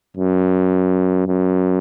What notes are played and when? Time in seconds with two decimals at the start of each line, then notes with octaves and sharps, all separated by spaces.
0.17 F#2
1.27 F#2